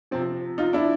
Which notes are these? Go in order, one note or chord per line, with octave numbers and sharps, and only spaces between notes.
C3 F3 C4
D#4 F4
D4 E4